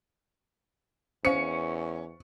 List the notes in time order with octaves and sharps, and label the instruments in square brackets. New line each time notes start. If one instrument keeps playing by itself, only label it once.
[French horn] E2 [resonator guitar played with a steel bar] C#4 [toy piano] C5 F5 [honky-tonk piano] C#7